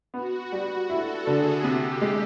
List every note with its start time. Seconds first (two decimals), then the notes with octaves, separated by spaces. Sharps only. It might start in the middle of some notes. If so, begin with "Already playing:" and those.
0.14 B3 F#4
0.52 G3
0.89 E4 A4
1.27 D3 G#4
1.64 C3 G4
2.01 G#3